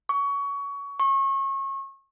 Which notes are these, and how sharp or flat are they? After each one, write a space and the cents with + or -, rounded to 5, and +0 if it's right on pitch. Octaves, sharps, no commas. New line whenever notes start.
C#6 +25
C#6 -30